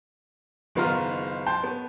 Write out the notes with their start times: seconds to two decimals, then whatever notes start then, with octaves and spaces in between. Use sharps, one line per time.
0.75 F#1 D#3 B3 F4 A#5 F6
1.46 G5 A5 C6 G6
1.63 B3